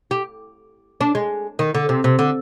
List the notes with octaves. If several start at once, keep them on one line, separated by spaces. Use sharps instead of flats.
G4
D4
G#3
D#3
D3
C3
C3
D3